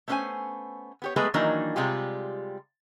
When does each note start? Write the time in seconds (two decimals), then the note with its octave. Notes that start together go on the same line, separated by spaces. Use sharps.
0.08 A3 B3 C#4 B4 C5 G#5
1.02 B3 G4 C#5
1.16 F#3 G#3 A3 B3 G#4 B4
1.34 D#3 E3 F#3 A#3 D4 D#4
1.76 C3 G3 G#3 F4 G4